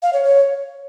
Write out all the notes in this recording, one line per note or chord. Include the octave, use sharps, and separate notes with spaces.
F5
C#5
C#5